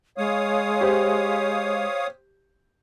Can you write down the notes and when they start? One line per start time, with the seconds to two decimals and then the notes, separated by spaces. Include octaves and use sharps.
0.18 G#3 C#5 F5 D#6
0.81 G4 C5